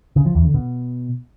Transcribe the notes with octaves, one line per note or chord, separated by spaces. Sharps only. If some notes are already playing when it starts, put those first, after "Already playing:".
C#3
F3
E2
D3
B2